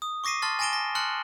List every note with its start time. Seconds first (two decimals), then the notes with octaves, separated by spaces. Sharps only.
0.02 D#6
0.24 C#6 D6 A#6 C7 D#7
0.42 A5 C6 F6 A6
0.59 G#5 A6 A#6 D7 E7 G7
0.73 A#6
0.95 A5 C6 F6 F#6 C#7 F#7